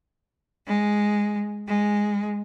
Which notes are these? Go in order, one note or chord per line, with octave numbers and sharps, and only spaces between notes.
G#3
G#3